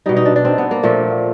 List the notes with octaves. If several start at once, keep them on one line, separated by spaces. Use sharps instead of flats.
B2 G3 D#4
D#4
D4
D4
C4
B3
A#3
A#2 F3 A3